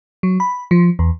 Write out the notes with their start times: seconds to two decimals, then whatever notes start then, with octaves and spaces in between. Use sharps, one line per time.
0.23 F#3
0.40 B5
0.71 F3
0.99 E2